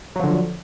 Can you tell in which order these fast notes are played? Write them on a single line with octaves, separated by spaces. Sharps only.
F#3 F3 D3